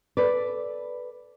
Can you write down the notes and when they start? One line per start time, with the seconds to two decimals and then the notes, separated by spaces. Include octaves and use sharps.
0.17 A4 B4 D5